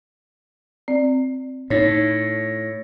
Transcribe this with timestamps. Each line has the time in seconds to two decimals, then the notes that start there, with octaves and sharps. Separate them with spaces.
0.88 C4 D5
1.70 A2 D#4 C#5